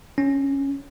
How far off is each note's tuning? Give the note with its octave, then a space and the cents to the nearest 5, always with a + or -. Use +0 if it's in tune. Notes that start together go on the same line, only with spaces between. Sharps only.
C#4 -5